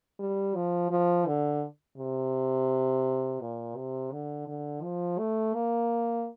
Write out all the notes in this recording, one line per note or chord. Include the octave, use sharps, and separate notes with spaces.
G3
F3
F3
D3
C3
A#2
C3
D3
D3
F3
A3
A#3